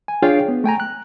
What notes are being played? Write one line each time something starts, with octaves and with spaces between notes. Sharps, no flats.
G#5
D4 F4 G#4 C#5 F5 G5
B3
A3 G5 G#5 A#5
F#6